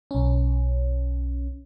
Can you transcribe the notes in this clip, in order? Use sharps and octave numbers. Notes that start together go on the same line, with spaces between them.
B1 C#4